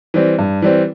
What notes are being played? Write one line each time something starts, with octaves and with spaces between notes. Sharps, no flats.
E3 G3 C4
G2
E3 G3 C4